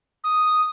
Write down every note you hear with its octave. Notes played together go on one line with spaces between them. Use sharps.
D#6